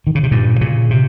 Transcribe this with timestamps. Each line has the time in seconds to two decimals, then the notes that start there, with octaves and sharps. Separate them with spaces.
0.07 D#3
0.15 C#3
0.23 C3
0.31 G2 A#2
0.61 A#2 C#3
0.90 C3